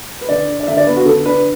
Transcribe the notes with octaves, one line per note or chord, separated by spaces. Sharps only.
B4
D3 D5
D4
D5
D3 E5
D5
B3 B4
F#4
D3 A4
D4 B4